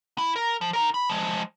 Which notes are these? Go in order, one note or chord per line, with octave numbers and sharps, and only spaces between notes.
E4
A#4
F3
D#4 A#4
B5
F3 G#3